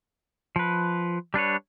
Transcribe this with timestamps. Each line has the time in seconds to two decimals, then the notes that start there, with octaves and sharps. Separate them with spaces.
0.56 F3 B4
1.34 G3 D4 B4 C#5